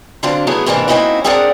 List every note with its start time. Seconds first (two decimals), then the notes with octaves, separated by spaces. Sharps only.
0.23 D3 F#3 C4 D4 F4
0.47 F#3 A3 B3 E4 G#4 C#5
0.66 G#2 C3 E3 A#3 D4
0.88 A#3 C4 C#4 D#4 E4 F#4
1.24 C4 D4 G#4 A#4 D5 F#5